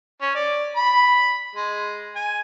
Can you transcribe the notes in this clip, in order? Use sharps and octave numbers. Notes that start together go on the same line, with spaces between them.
C#4
D5
B5
G#3
G#5